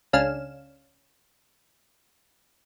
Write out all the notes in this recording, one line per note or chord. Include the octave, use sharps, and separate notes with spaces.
C#2 C#4 D4 F5 E7